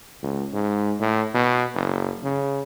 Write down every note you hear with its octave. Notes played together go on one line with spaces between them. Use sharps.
C#2
G#2
A2
B2
F#1
C#3